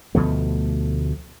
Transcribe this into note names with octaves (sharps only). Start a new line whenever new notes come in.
D2 B2 F3 A3